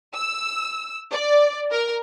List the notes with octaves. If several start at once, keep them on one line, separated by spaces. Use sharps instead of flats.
E6
D5
A#4